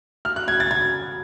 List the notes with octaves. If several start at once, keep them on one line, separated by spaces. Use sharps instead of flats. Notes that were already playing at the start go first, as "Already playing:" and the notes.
F6
F#6
G#6
A6
G#6